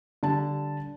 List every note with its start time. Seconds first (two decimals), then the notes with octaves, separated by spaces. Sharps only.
0.23 D3 G3 A5